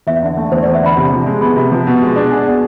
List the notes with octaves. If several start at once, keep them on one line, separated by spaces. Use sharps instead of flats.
E2 E5
D3
A3
E2 C5
E2 D5
E5
D3 B5
C3 B5
F3
G#3
B3 B5
C3
F3
B2
G#3
D4
G#4 G#5
B2